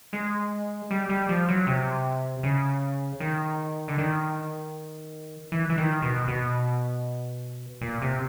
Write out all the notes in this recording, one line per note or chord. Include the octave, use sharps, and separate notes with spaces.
G#3
G3
G3
F3
F#3
C3
C#3
D#3
D3
D#3
E3
E3
D#3
B2
B2
A#2
C3